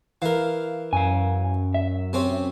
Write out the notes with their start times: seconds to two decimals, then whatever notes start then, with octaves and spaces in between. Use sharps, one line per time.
0.22 E3 A#4 F5
0.93 F#2 F5 G#5
1.74 E5
2.13 C3 C4 C#4